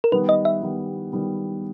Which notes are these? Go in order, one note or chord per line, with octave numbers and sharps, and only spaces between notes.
A#4
D#3 G3 B3 B4
D#5
E5
D#3 G3 B3
D#3 G3 B3